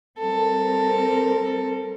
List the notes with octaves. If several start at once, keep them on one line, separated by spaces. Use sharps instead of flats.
G3 C4 A4 A#4